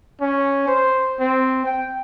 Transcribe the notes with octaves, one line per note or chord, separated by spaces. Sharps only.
C#4
C5
C4
G5